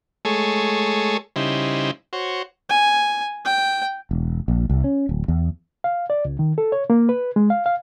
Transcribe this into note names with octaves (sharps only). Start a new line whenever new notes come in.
G#3 A3 G#4 A4 C#5
C#3 G3 D#4 E4 C5
F#4 C5 C#5
G#5
G5
E1
A#1
C2
C#4
D1
E2
F5
D5
C#2
D#3
A4
C#5
A#3
B4
G#3
F5
F5